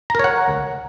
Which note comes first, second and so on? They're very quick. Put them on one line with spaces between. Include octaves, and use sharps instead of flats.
A#5 A#4 C#5 F#5